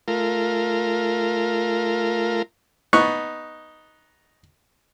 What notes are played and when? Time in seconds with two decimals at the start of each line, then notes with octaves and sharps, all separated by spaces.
0.08 A3 F4 A#4
2.93 B3 D#4 C#6 F#6